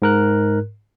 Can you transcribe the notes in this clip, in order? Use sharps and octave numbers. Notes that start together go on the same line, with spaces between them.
G#2 A#4 F#6